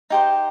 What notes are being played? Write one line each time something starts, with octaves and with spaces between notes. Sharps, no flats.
D#4 G4 C5